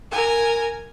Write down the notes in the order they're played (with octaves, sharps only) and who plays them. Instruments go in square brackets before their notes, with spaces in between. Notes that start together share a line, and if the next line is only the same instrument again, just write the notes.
[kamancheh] A#4 G#5